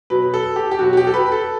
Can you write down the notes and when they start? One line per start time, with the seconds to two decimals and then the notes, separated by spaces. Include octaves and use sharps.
0.10 B2 F#3 B4
0.34 A4
0.56 G4
0.71 G4
0.79 B2 F#3 F#4
0.93 F#4
0.97 G4
1.07 A4
1.14 B4
1.32 A4